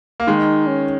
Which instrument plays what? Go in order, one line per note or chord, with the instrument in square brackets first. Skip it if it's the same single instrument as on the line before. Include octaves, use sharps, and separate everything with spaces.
[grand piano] A#3
[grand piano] D#3 G#3 [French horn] D#4
[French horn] C#4